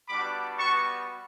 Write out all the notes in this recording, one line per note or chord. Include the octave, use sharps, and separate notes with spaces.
G3 B3 D4 F#4 B5 D6
G3 B3 F#4 A5 C#6